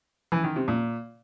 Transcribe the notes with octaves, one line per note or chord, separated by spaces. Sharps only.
E3
D#3
C3
A#2